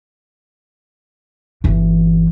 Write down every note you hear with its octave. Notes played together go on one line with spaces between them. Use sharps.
G1 E3